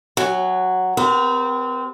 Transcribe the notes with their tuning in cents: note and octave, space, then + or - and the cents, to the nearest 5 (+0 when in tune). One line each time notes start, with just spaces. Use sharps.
F#3 +0 G#5 -25
C4 -25 G4 +30 A#4 +40